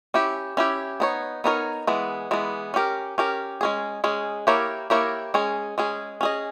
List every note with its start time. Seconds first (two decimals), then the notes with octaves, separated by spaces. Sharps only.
0.14 C#4 E4 G4
0.57 C#4 E4 G4
1.00 B3 D#4 A#4 C#5
1.44 B3 D#4 A#4 C#5
1.87 E3 G#3 B3
2.31 E3 G#3 B3
2.74 C#4 G4 A#4
3.18 C#4 G4 A#4
3.61 G#3 C#4 G#4
4.04 G#3 C#4 G#4
4.47 A#3 E4 G4 A#4 C#5
4.90 A#3 E4 G4 A#4 C#5
5.34 G#3 C#4 G#4
5.78 G#3 C#4 G#4
6.21 C#4 G#4 D#5